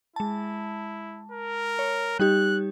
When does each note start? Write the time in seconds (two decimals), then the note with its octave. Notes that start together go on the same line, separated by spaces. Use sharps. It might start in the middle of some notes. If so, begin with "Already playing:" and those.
0.16 G#3 E4 A5
1.32 A#4
1.79 C#5
2.19 G3 D#4 G4 F#6